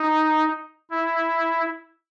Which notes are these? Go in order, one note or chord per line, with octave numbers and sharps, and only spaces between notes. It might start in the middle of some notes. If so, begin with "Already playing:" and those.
Already playing: D#4
E4